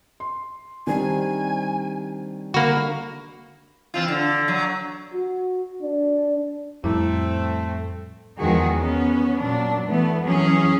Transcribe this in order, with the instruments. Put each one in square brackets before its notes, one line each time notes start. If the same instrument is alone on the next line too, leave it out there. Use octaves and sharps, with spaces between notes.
[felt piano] C6
[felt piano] D#3 [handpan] G3 C4 D4 [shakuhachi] G#5
[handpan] D3 [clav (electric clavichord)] A#3 F#4 [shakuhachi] B5
[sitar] E3 C4 F4
D3
F#3
[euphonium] F#4
D4
[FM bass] F2 [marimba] A2 G3 E4 [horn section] A3 C4
[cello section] E2 D#3 F3 G#3 F#4 G#4
B3 C#4
A#2 F#3 D4
E3 A3 B3
E3 F#3 C#4 G#4